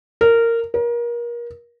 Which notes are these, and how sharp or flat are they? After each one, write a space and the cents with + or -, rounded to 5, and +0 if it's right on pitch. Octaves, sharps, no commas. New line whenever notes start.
A#4 -15
A#4 +30